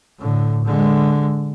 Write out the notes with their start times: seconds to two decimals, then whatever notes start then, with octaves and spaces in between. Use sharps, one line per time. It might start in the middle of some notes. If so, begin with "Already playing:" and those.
0.19 A2 D3
0.65 D3 G#3